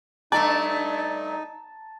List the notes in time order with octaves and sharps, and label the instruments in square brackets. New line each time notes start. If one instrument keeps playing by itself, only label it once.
[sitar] G2 A3 D5 [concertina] D#4 [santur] A5 [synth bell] A#5